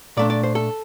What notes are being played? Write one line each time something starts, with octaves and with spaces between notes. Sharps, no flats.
A#2 A3 D4 D5
D5
C5
A4